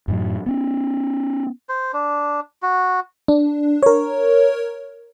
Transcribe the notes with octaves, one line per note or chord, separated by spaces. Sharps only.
F#2 A2 F#3
B3 C#4
C5
D4
F#4
D4
A#4 C#5